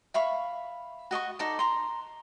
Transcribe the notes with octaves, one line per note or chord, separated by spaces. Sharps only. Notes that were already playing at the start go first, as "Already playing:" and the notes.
E5 F5 B5 C#6
F#4 D#5 A5 C#6
D#4 A4 D5
A#5 C6